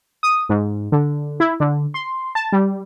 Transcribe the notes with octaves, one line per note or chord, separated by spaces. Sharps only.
D#6
G#2
D3
E4
D3
C6
A5
G3